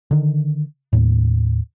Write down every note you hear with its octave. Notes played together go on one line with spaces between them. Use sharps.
D3 D#3
D#2 A2